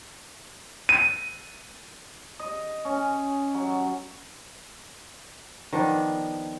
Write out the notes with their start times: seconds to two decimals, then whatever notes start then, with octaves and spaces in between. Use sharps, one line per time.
0.89 D#7
2.39 D#5
2.85 C#4
3.54 F#3
5.73 D#3 F3 B3 D4